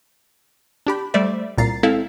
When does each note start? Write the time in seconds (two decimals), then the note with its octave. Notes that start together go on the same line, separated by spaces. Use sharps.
0.87 D4 G4 B5
1.14 G3 A3 C5 D5 E5
1.58 C2 A#2 A#5 A6 C7
1.83 G#3 C4 E4 A4 F5